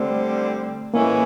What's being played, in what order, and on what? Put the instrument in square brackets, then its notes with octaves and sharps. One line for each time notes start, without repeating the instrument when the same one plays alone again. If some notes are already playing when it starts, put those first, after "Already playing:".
Already playing: [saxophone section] D3 G3 C4 [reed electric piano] A3
[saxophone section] A2 E3 G#3 C#4 E4 [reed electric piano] A#3